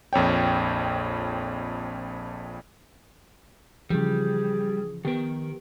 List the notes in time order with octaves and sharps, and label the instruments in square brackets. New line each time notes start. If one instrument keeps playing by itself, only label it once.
[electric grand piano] A#1 F2 C#5 G5
[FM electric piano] C#3 E3 [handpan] F3 [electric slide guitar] G3 [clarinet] G#4
[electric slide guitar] D#3 A#4 [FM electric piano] B3 G4